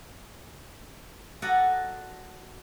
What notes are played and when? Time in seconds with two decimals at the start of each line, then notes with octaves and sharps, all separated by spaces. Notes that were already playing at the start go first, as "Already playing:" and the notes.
1.42 F#4 A4 D5 D#5 F#5 A#5